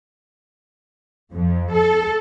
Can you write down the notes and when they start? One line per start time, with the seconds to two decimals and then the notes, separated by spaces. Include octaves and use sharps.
1.33 F2
1.73 A4